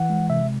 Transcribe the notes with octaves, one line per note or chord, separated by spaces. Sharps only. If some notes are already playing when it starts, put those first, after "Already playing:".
Already playing: E3 F#5
G#3
C3 E5